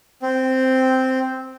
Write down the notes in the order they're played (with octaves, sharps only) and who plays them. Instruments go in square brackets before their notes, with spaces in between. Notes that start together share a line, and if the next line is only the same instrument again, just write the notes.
[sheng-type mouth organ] C4